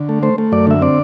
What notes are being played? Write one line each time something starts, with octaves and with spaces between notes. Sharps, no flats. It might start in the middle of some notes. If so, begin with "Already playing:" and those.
Already playing: D3
A3
A3 C5
A3
F#2 D5
D3 E5
C4 D5